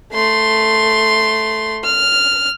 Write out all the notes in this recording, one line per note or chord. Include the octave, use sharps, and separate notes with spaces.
A3 C6
F6